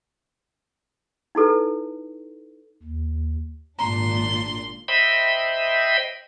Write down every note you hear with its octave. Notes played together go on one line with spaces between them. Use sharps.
D#4 E4 A4 B4
D#2
G#1 A#2 D4 A#5 C6
C5 D#5 E5 G5 B5